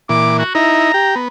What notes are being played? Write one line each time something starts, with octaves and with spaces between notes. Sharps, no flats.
A#2 E3 D6
F#4
D#4 E4 A#5
G4
B3